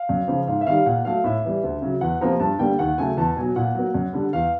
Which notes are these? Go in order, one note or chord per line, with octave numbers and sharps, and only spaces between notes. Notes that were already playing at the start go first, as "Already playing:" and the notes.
Already playing: F5
F#2
C#3 F3
G#2 F5
E5
D#3 G3 F5
A#2 F#5
F#3 A3 F5
A2 E5
E3 G3
D2
C#3 F#3
E2 F#5
C3 F3 A#3 A#5
G2 A5
D3 G3 A#3 G5
D#2 F#5
C#3 F#3 A3 G#5
E2 A5
B2 F#3 G#5
A#2 F#5
F#3 A#3
F#2
D3 G3
E2 F5